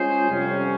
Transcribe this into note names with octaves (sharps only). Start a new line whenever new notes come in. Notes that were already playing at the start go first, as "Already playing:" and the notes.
Already playing: G#3 C#4 F4 G#4 C5
F2 C3 G3 C#4